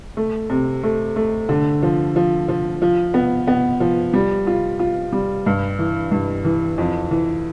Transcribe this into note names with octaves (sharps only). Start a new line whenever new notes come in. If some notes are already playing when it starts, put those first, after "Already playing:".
A3
C3
A3
A3
D3
F3
F3
F3
F3
B3
B3
F3
G3
F4
F4
G3
G2
E3
G2
E3
F2
E3